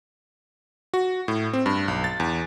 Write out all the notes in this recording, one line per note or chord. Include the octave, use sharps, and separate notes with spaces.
F#4
A2
C4
G2
B1
A6
E2